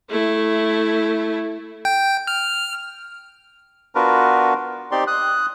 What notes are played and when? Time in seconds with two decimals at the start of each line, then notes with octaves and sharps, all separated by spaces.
0.10 A3 E4
1.85 G5
2.27 F6
3.95 B3 D4 F4 F#4 A#4 B4
4.91 C4 D#4 G4 D5 C6
5.07 D#6 F#6